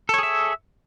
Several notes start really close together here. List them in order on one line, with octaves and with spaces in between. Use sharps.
A4 C#5 G#4 E5